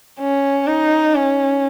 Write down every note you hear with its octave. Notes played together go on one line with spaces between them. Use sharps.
C#4
D#4
C#4